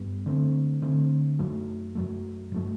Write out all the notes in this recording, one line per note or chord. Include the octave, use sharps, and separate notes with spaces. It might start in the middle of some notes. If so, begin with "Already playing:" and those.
Already playing: G2 G3 B3
D3 A3 C4
D3 A3 C4
F#2 F#3 A3
F#2 F#3 A3
G2 F#3 A3